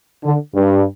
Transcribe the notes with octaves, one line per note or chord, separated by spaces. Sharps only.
D3
G2